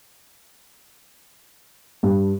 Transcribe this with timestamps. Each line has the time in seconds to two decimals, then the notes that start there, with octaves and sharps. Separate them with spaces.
2.03 G2